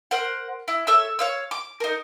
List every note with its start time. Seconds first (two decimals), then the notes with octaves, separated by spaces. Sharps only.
0.11 A#4 C5 F#5
0.68 E4
0.87 A4 C#5 E5 E6
1.19 C#5 F5 E6
1.51 D6
1.80 D#4 A#4